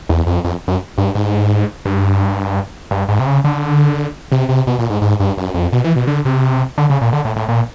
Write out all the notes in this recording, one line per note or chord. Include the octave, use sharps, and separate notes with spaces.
E2
F2
F2
F#2
G2
G#2
G2
G2
G#2
C3
C#3
D3
C3
C3
B2
A#2
G#2
G#2
G2
F#2
F2
B2
E3
B2
D3
C3
D3
C#3
A#2
D3
A2
A2
A#2